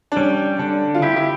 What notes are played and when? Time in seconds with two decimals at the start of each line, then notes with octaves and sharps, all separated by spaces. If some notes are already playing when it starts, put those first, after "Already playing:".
0.12 D4
0.16 G3 C#4
0.59 D3 D4
0.94 F4
1.02 E4 G4
1.16 E4